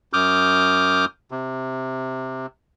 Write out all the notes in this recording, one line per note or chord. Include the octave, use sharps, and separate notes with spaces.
F#2 D6 D#6 F6 G6
C3